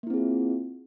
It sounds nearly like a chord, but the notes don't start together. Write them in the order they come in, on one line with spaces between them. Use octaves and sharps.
A#3 E4 C4 G#4 F4